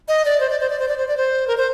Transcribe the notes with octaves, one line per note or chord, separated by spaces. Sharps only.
D#5
D5
C5
D5
C5
D5
C5
D5
C5
D5
C5
A#4
C5